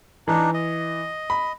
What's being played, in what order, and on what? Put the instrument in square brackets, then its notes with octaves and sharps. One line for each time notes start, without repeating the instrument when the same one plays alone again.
[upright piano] E3 [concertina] D4 D#4
[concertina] D#5
[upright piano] B5